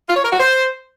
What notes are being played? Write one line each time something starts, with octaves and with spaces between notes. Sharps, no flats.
F4
C#5
A#4
F#4
C5